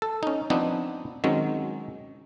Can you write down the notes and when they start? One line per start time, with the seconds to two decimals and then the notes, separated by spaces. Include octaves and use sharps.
0.02 A4
0.23 C#4 D#4
0.50 F3 B3 C4 D4 D#4
1.24 D#3 F#3 G#3 C4 C#4